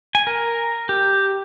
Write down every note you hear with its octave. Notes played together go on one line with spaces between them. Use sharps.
G#5
A#4
G4